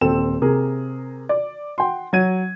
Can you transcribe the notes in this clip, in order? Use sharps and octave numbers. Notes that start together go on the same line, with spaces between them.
D#1 C4 A4 G5 E7
C3 G#4 A#4
D5
F#5 G5 C6
F#3 F#5 G#6 D#7